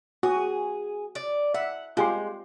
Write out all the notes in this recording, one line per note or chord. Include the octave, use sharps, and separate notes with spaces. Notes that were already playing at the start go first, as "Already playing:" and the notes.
F#4 G#4
D5
E5 F#5
G#3 F4 G4 C6